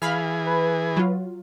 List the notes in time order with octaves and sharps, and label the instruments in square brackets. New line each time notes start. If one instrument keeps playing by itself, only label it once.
[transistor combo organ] E3 G#4 [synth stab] F5 B5 F6
[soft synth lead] B4
[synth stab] F#3 F4